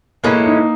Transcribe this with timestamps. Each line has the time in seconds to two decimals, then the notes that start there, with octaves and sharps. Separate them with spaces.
0.24 A2 E3 G#3 A#3 C#4
0.45 D#4